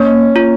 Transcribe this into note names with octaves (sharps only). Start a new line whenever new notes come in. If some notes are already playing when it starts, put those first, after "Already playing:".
Already playing: A#3 C#4
F4